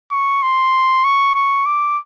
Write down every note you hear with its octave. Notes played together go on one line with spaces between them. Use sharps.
C#6
C6
C#6
C#6
D6